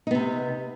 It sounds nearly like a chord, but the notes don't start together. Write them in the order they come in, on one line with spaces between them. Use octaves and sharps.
D#4 B3 C3